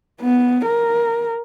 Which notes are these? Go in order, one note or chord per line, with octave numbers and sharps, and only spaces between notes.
B3
A#4